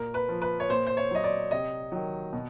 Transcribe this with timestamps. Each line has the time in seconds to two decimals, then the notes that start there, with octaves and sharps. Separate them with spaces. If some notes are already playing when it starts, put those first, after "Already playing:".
Already playing: A#2 A#4
0.14 B4
0.28 F3
0.42 B4
0.60 C#5
0.69 A#2 C5
0.87 C5
0.97 C#5
1.11 F#3 D#5
1.24 D5
1.51 C3 D#5
1.92 D#3 F#3
2.33 B2